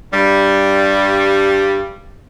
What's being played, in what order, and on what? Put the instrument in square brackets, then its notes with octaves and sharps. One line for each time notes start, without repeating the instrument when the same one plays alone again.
[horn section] G2 G3